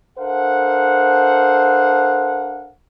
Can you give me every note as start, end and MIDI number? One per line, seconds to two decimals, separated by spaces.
0.19 2.71 62
0.19 2.71 69
0.19 2.71 70
0.19 2.71 72
0.19 2.71 77
0.19 2.71 78